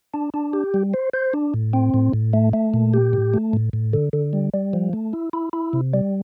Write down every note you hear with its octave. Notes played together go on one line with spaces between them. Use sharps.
D4
D4
G4
G3
C5
C5
D4
A2
C4
A2
A2
A3
A3
A#2
G4
A2
A3
A2
A2
D3
D3
G3
G3
F3
A3
E4
E4
E4
C3
G3